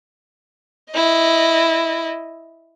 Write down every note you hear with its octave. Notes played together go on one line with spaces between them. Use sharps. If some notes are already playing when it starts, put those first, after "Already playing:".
E4 D#5